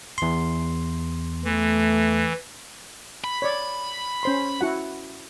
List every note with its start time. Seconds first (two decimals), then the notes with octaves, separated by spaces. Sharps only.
0.18 E2 C6
1.44 E3 A3
3.24 B5
3.42 C#5 D5
4.23 C#4 C5 C6
4.61 E4 F#4 F#5